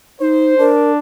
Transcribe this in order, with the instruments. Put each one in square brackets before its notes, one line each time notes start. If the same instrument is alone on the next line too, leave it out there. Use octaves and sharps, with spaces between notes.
[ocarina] D#4 [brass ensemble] C5
[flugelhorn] D4 [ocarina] A#4